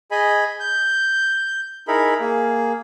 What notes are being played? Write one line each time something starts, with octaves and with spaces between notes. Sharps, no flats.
G#4 D#5 G#5 B5
G6
D#4 E4 G#4 A#4 B5
A#3 G#4